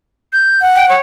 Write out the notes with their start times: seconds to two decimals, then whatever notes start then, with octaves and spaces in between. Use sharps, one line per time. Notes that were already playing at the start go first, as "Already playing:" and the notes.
0.33 G6
0.61 F#5
0.76 G5
0.89 C#5